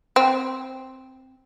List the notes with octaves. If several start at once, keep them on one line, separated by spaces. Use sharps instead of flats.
C4